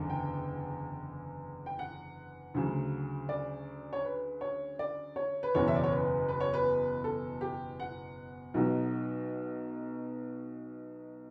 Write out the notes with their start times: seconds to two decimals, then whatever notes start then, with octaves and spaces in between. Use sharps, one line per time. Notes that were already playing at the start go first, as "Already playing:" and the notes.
Already playing: F#1 E2 D3
0.10 G5
1.66 G5
1.79 F#5
2.54 D2 C#3 F#3
3.29 D5
3.93 C#5
4.04 B4
4.41 C#5
4.79 D5
5.16 C#5
5.43 B4
5.55 F#1 E2 B2 C#5
5.68 E5
5.75 D5
5.83 C#5
5.91 B4
6.28 B4
6.40 C#5
6.54 B4
7.04 A4
7.41 G4
7.80 F#5
8.54 B1 B2 F#3